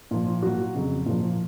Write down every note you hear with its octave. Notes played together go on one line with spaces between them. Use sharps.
A#2 F3
A#2 F#3 F#4
F2 C#3 F#3
A#2 F3